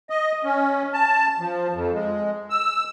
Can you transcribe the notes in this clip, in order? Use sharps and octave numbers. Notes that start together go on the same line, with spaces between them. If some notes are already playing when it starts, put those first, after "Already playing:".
D#5
C#4
A5
F3
F2
G#3
E6